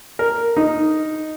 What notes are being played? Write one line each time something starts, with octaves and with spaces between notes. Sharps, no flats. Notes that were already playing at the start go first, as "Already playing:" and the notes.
A#4
D#4